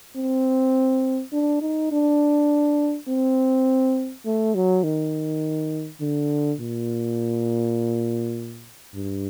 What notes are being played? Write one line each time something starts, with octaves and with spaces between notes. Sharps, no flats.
C4
D4
D#4
D4
C4
A3
F#3
D#3
D3
A#2
G2